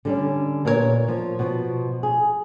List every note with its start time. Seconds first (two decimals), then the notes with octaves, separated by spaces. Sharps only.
0.05 D3 G3 C#4
0.65 A#2 B3 A#4 B4 C#5
1.08 F3
1.39 B2 F3
2.03 G#4